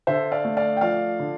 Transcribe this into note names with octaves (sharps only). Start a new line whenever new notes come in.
D3 C5 E5
D5 F5
A3
D5 F5
G5
F3 D5 F5
D3